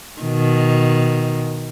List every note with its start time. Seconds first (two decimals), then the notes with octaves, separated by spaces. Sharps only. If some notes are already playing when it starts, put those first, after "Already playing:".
0.21 B2 D#3